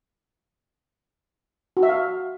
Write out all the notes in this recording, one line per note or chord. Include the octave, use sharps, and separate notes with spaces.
F#4
E5
F5